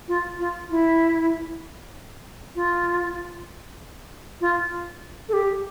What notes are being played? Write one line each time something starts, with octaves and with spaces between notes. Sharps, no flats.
F4
F4
E4
F4
F4
A4
G4